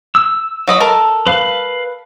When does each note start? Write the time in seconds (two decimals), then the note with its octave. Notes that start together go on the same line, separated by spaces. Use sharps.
0.15 E6
0.67 F#3 D#5 B5
0.80 A4 A#4
1.27 B4 F5